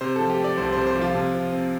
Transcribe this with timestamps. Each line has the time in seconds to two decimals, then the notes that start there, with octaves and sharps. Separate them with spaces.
0.01 C3 C5
0.16 F3 A4
0.30 G4
0.39 A3
0.44 D5
0.57 C2 C5
0.73 C3 C5
0.87 C5
0.96 F3
1.01 F4
1.15 C3
1.35 F3
1.53 C4